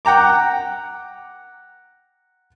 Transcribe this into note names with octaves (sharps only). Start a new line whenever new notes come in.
F#5 G5 A#5 D6